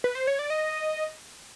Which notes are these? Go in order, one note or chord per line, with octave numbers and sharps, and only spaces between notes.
B4
C5
C#5
D5
D#5